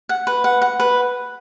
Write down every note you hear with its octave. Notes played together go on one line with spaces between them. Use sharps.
F#5
B4
F#5
F#5
B4